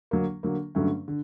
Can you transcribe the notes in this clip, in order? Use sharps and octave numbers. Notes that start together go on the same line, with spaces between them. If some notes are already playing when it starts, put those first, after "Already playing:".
D3 F#3 A#3
D3 F#3 A#3
G2 D3 F#3 A3 C#4
D3